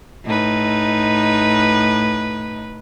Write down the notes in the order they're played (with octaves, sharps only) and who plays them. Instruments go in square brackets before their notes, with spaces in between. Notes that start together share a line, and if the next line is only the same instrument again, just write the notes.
[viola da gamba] A2 D#4 B4